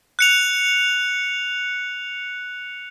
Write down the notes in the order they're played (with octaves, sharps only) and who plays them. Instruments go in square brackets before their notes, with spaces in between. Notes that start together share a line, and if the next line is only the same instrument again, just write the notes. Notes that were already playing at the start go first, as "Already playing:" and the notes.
[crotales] F#6 C#7 F7